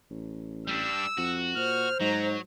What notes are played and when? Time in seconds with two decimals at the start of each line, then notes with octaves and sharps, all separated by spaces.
0.10 A1
0.67 G3 D4 E6
1.18 F2 F#4
1.56 A#2 C5 F6
2.00 G#2 F#3 A#5